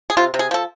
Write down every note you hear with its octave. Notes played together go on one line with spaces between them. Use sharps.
G#4
C3 F4
C3
G#4
F3 A4